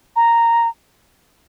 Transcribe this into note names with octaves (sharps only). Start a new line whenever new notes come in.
A#5